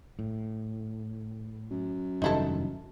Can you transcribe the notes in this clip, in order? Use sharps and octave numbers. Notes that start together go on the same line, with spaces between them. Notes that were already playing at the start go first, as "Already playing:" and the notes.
A2
F#2
F1 G2 D#3 D#4 E4 A4